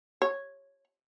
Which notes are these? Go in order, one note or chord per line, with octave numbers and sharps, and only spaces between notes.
C#5